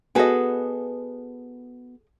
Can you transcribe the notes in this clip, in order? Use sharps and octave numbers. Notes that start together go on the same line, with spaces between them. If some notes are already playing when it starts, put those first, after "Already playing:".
B3 F#4 G#4 A4 B4 D#5